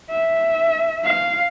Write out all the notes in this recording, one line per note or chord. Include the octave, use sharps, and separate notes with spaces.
E5
F5